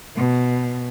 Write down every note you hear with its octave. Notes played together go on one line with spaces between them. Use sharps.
B2